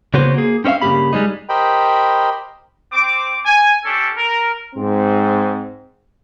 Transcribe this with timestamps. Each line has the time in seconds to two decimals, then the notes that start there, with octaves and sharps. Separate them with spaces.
0.14 C#3 A#3 B3 F#4 B4 C5
0.34 A#3 G#4
0.64 C4 C#4 C5 E5 F5
0.82 G2 C#3 A3 A#3 G4 B5
1.13 G3 G#3 C4 D#4
1.49 G4 A#4 C5 D#5 G5 B5
2.92 C4 D6
3.46 G#5
3.85 C#4 D4 G4 A4
4.17 A#4
4.75 G#2 C4